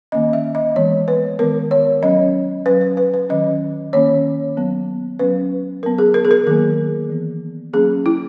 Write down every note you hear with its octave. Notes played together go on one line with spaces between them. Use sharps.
D#3 A#3 C#4 D#5
E5
D#5
E3 G#3 B3 C#5
B4
D#3 G#3 B3 A#4
C#5
F#3 C#4 D#5
F#3 C#4 B4
B4
B4
B4
D#3 F#3 C#4 D#5
D#3 A#3 C#4 C#5
F#3 B3
F#3 C#4 B4
F#3 B3 A#4
G#4
A#4
G#4
A#4
D#3 F#3 A#3 G#4
E3 B3
F#3 A#3 C#4 G#4
E4